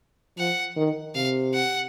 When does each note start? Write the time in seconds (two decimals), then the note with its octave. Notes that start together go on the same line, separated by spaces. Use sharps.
0.38 F3 F#5
0.77 D#3
1.15 C3 F5
1.54 F#5